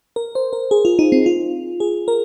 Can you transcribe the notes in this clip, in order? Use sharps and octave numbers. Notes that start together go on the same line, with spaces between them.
A#4
C5
A#4
G#4
F4
D#4
C4
F4
G#4
A#4